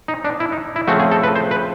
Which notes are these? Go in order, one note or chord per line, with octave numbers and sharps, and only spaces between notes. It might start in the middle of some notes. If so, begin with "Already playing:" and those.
D#4
D4
E4
D#4
E4
C#3 F3 A3 C4 F#4
G#4
A4
B4
C5
B4